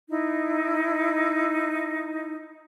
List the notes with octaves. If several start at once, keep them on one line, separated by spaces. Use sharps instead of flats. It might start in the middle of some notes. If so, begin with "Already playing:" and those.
D#4 E4